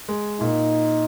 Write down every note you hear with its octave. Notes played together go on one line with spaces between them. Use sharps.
G#3
A#2 D#4